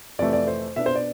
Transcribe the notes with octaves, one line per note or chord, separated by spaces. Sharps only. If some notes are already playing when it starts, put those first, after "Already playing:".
F2 C3 E3 A3 D5
D5
C5
B2 B3 D4 E5
C5
D5